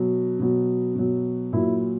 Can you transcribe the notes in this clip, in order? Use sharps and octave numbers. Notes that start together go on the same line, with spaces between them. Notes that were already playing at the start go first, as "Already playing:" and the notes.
Already playing: B2 F#3
B2 F#3
B2 F#3
A#2 F#3 E4